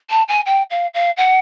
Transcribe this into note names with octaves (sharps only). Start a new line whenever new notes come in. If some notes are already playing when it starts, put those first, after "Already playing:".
A5
G#5
G5
F5
F5
F#5